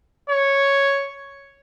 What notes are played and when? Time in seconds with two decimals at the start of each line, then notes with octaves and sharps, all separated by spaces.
0.30 C#5